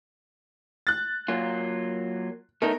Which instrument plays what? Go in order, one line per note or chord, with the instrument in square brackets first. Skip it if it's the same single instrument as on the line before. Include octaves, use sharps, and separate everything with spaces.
[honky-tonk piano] F#6 A6
[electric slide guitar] F#3 A#3 F4
[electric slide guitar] A3 B3 D#4 [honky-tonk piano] A#4